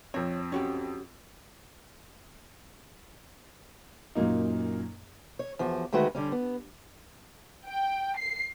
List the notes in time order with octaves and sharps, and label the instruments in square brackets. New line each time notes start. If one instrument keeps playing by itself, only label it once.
[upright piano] F2 C4 [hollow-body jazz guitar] C#5
[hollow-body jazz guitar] C#4 F#4 G4
[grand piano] F#2 A#2 F#3 A#3 D#4
[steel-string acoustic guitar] C#5
E2 F3 F#4
D2 D#3 G#3 A3 F#4 B4
D3 G3 C#4
B3
[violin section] G5
C7